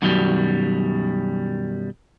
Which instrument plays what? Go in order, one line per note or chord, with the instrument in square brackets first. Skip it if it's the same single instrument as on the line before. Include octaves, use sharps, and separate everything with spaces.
[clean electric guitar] F#2 B2 D#3 F#3 G3